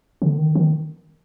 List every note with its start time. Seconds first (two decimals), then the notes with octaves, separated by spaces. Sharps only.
0.22 D3
0.38 D#3
0.55 D#3